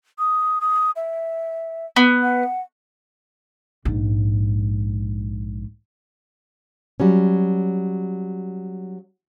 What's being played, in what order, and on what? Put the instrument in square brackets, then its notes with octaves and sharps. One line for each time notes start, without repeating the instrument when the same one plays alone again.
[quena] D#6
D#6
E5
[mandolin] B3
[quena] F#5
[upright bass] A#1 G#2
[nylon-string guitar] F#3 G3 C#4